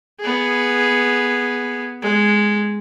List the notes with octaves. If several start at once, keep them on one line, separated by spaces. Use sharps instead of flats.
B3 G#4
G#3